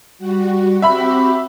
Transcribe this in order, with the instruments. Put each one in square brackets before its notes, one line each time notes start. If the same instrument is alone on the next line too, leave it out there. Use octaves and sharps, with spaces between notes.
[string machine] G3 F#4
[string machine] C4 F#4 G4 [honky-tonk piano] E5 B5